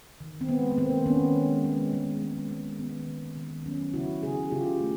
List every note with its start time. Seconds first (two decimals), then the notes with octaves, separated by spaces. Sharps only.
0.20 D#3
0.41 C4
0.49 G#3 B3
0.72 B3
0.77 D#3 A#3 C4
1.06 D#3 B3 C#4
1.36 G#3
1.65 G#3
1.93 G#3
2.22 G#3
2.50 G#3
2.79 D#3 B3
3.08 D#3
3.37 D#3
3.66 F#3 B3 C#4
3.94 C#3 E4 F#4
4.22 C#3 F#4 G#4
4.51 C#3 F4 G4
4.81 A3